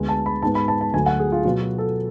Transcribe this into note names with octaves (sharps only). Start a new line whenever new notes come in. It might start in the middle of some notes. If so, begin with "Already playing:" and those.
Already playing: D2 D3 G#3 B3
A5
B5
G#2 G#3 B3 A5
B5
A5
A5
D2 D3 F#3 A3 G#5
F#5
G#4
F4
B2 F#3 B3 F4
F#4
A4